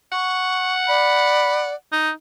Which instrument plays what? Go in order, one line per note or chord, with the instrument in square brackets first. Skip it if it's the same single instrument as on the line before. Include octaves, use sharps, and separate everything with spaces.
[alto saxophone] F#5 [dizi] C#6
[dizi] D5 [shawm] B5
[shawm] D#4